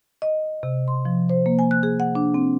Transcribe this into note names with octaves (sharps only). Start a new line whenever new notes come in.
D#5
C3
C6
F3
C5
A#3
G#5
F#6
G#4
F#5
D4
C4